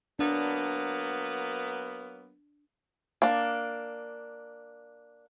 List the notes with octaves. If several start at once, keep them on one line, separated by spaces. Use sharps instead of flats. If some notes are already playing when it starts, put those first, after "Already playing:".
F#3 A#3 B3 D4
A#3 D4